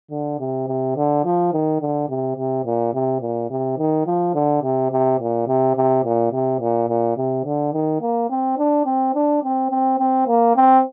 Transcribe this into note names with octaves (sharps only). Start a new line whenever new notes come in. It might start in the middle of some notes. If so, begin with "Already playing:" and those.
D3
C3
C3
D3
F3
D#3
D3
C3
C3
A#2
C3
A#2
C3
D#3
F3
D3
C3
C3
A#2
C3
C3
A#2
C3
A#2
A#2
C3
D3
D#3
A#3
C4
D4
C4
D4
C4
C4
C4
A#3
C4